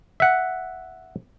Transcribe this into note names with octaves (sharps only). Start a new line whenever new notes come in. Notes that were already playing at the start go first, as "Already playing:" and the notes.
E5 F#5